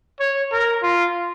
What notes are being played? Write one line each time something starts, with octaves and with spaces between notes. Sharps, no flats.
C#5
A#4
F4